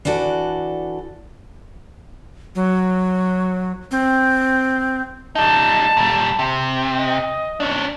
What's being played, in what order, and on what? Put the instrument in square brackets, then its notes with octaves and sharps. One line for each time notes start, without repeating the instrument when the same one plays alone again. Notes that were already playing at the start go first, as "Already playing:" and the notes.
[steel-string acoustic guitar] E3 D4 F#4 A4 D5
[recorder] F#3
C4
[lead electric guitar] G3 D#4 [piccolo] A5
[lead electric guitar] A#2 G3
C3
[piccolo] D#5
[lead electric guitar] C#4 D4